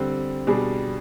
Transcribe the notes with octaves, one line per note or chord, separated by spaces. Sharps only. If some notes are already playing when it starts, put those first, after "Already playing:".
Already playing: D3 G3 C4
B2 G3 D4 G#4